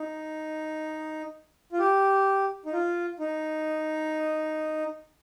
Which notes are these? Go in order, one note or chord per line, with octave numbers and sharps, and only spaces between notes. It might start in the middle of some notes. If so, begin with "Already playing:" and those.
Already playing: D#4
F4
G4
D#4
F4
D#4